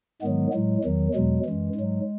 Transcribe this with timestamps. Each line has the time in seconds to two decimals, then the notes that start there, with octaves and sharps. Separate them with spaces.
0.22 G#2 D#3 F#3 G#3 B3
0.53 A2 F#3 G#3
0.84 E2 D#3 F#3
1.14 E2 B2 F#3 G#3
1.45 F#2 E3 G#3
1.75 G#2 F#3